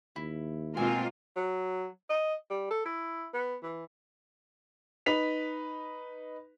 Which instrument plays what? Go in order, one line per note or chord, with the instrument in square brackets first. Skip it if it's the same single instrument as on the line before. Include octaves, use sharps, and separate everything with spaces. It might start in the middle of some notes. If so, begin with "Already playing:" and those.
[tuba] D#2 [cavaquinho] E4
[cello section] B2 C4 [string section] G#3 A#3 F4 [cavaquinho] G#5
[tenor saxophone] F#3
D#5
G3
A4
E4
B3
E3
[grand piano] D#4 B4 B6 F7